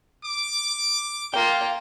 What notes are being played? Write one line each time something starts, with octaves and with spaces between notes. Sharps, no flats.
D6
A#3 F4 F5 G5